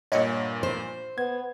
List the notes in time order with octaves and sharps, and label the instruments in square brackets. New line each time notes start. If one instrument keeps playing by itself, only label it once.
[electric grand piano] G2 A#2 [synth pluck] C#5 D#5 F#5
[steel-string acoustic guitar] C5
[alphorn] B3 [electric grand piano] G#6